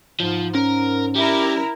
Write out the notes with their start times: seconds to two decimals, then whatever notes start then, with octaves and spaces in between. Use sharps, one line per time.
0.20 G#2 F3
0.55 C#4 A#4
1.16 G3 E4 A#4